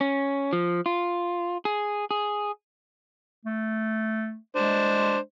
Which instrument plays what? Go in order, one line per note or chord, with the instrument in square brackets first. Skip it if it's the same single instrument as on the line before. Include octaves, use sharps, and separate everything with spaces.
[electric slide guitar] C#4
F3
F4
G#4
G#4
[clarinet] A3
[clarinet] G#3 [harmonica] D4 C5